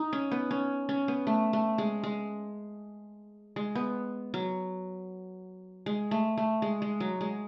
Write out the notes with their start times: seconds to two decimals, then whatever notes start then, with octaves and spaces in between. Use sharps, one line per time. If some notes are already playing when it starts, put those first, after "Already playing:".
Already playing: D#4
0.13 C#4
0.31 B3
0.51 C#4
0.89 C#4
1.08 B3
1.27 A3
1.53 A3
1.78 G#3
2.03 G#3
3.56 G#3
3.75 B3
4.34 F#3
5.86 G#3
6.11 A3
6.37 A3
6.62 G#3
6.82 G#3
7.00 F#3
7.21 G#3